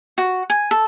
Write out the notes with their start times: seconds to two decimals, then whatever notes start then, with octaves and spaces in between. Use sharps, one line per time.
0.18 F#4
0.50 G#5
0.71 A4